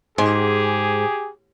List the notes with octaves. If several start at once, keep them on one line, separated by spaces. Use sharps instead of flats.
G#2 G4 G#4